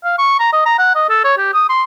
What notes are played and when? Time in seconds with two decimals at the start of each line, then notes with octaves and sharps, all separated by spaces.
0.04 F5
0.19 C#6
0.39 A#5
0.53 D#5
0.66 A#5
0.78 F#5
0.95 D#5
1.09 A4
1.24 C#5
1.38 G4
1.54 D#6
1.69 C6